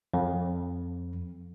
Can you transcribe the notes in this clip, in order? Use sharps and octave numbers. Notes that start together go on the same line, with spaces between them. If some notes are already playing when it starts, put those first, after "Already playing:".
F2